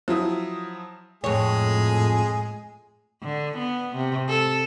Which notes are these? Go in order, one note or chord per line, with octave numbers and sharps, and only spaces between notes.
F3 F#3 E4 D#6
F2 A2 G#3 G#4 C#5
D3
B3
C3
A4